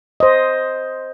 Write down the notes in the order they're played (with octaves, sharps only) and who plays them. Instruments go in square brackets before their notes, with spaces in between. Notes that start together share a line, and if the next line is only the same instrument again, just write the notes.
[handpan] C5 D#5